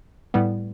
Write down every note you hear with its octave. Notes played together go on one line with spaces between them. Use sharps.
A2 G3 B3